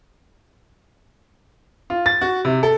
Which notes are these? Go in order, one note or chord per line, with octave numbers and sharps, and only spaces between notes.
F4
A6
F#4
C3
A4